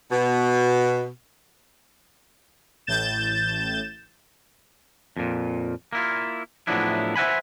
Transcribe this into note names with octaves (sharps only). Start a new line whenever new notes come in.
B2
A1 A2 G6 A6 E7
F2 A#2
A#3 E4 F4
A2 F3 F#3 B3 D4 E4
C5 E5 F#5 G#5 B5